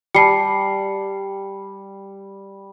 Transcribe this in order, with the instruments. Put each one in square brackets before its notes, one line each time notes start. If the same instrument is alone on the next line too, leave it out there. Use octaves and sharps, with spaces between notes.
[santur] G3 [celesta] A5 C7 C#7